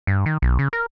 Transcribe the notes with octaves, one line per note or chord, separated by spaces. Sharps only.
G2
D#3
B1
C#3
A#4